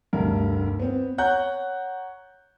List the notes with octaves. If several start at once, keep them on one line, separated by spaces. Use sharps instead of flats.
F1 D2 G2 A#4
B3 C4
C#5 F#5 A#5 F#6 G6